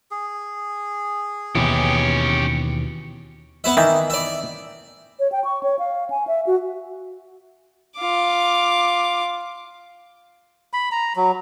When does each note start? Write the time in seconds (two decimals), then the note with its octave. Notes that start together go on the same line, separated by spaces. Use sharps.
0.11 G#4
1.55 D#2 B2 E3 C#4 G4
3.64 B3 E4 E5
3.77 D#3 E3 E5
4.10 D5 E5
5.20 C#5
5.32 G5
5.44 C#6
5.63 C#5
5.79 F5
6.10 G#5
6.27 E5
6.47 F#4
7.98 F4 D6
10.73 B5
10.92 A#5
11.16 F#3